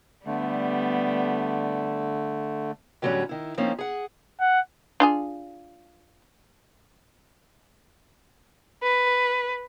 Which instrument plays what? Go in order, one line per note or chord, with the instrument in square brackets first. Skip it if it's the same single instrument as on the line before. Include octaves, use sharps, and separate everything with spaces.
[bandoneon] D3 A3 [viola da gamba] G3 B3
[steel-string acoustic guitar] A2 D3 F#3 G3 C#4
D#3 E4
F3 A#3 C4 C#4 D#4
G#4 F#5
[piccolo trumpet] F#5
[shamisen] D4 F4 G#4
[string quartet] B4